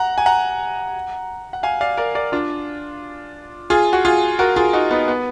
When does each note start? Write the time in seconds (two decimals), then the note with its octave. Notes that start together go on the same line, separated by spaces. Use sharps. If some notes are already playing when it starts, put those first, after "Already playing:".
Already playing: F#5 A#5
0.18 G#5
0.26 F#5 A#5
1.53 F#5
1.63 F5 G#5
1.81 D5 F5
1.97 A#4 D5
2.15 A#4 D5
2.32 D4 F4
3.70 F4 G#4
3.93 F#4
4.05 F4 G#4
4.39 F#4 A#4
4.56 F4 G#4
4.73 D#4 F#4
4.90 B3 D#4
5.08 B3